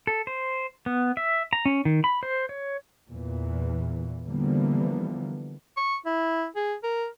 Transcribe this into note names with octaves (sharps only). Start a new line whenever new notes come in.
A4
C5
B3
E5
A#5
C#4
D#3
B5
C5
C#5
E2 A#2 E3
D3 E3 F3 G3 A#3 B3
C#6
E4
G#4
A#4